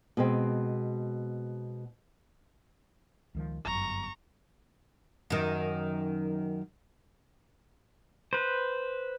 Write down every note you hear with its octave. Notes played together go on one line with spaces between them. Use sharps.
B2 G#3 C4
C#2 D#3 F3
G1 F#2 A#5 C#6
F#2 D#3
B4 C5